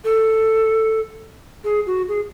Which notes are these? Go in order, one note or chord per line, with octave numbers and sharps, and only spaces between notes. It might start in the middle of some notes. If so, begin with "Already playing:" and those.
A4
G#4
F#4
G#4